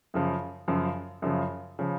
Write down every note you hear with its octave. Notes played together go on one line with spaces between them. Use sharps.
F#2 C#3 F3
F#2 C#3 F3
F#2 C#3 F3
C#3 F3